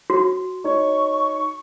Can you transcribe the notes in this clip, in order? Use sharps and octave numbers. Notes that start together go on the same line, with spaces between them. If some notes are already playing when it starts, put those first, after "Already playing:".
F#4
D#4 C#5 C#6